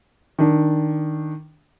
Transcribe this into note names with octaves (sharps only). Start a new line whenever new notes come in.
D#3 D4